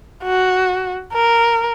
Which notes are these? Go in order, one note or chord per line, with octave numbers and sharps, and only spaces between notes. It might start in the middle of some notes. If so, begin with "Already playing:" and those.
F#4
A#4